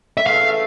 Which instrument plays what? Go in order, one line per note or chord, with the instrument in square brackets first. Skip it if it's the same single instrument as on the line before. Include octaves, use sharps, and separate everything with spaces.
[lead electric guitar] E5
[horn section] C#3 E3 A3 [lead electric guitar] F5